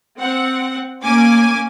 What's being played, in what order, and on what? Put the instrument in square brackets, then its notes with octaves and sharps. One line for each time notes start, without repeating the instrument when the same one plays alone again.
[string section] C4 F#5
A#3 C#4 G#5 D6